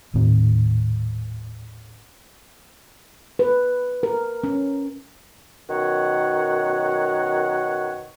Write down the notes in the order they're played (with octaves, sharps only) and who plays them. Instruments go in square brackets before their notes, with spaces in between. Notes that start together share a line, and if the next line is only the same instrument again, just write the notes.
[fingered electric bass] D#1 A2 D#3 C4
[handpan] B4
A#4
C#4
[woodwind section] F#2 B2 D#3 C#5 F#5